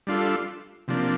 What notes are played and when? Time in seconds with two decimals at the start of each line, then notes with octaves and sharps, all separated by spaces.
0.07 G3 D4 F4 A4
0.88 C3 F3 A#3 D4